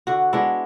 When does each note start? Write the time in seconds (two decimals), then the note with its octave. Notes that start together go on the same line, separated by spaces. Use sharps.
0.07 D3 F#4
0.33 G#3 B3 D4 E4